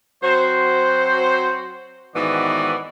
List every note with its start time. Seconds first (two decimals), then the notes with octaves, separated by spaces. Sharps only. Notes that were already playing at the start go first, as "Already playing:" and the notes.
0.23 F#3 C4 F#4 C5
2.15 G#2 D#3 E3 B3 F#4 D5